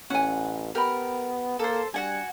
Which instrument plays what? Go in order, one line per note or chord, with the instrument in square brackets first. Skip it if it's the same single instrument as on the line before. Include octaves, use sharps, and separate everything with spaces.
[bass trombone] A1 [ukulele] C#4 G#5 [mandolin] F#5
[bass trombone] B3 [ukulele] G4 G5 B5 [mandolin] A#4
[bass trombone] A#3 [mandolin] A4 C5
[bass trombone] G3 [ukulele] D4 [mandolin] F#4 F#5 G#5